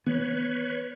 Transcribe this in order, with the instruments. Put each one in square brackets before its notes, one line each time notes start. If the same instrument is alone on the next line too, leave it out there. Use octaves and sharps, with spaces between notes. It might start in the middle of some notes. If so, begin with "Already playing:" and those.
[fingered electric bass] E3 B3 [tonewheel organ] B4 C#5